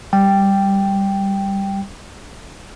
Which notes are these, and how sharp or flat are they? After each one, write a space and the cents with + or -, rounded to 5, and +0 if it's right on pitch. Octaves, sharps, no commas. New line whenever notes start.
G3 +5 G5 +0